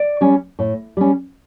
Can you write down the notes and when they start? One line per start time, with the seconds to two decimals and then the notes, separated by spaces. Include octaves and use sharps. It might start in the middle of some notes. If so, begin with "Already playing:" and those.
Already playing: D5
0.21 G3 C#4
0.59 A2
0.97 G3 C#4